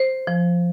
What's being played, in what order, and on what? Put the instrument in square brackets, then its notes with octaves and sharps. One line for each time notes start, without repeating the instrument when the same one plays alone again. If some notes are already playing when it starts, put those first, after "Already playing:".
Already playing: [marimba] C5
F3